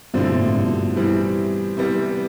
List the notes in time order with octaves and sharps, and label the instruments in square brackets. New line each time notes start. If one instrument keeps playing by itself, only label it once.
[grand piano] G2 B2 [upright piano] D3 F3 A3 C4 E4
[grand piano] G2 B2
A2
A2
G2 B2
[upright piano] A2 E3 G3 C4
C3 E3 G3 B3